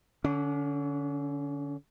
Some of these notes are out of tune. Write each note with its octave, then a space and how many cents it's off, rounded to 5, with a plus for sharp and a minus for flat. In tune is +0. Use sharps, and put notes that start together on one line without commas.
D3 +0 C#4 +35